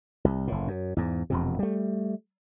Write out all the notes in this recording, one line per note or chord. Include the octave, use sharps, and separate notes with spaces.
C2
F#1 A2
F#2
E2 G#2
E1 F2 C3
G3 A3